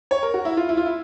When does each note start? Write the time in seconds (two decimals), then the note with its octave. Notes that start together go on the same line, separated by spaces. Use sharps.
0.11 C#5
0.23 A#4
0.34 F#4
0.45 E4
0.57 F4
0.69 E4
0.77 F4
0.86 E4